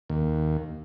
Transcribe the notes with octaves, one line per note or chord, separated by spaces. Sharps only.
D#2